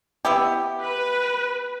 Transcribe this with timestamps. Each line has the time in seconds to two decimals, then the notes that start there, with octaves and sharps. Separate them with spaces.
0.25 B3 E4 G4
0.81 B4